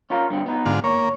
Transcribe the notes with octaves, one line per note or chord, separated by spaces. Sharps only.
C#4 F4 A#4
G2 D3 C4
B3 D#4
G#2 D3 F4
A#3 C#5